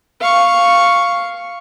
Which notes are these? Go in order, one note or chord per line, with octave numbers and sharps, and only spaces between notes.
F5 C#6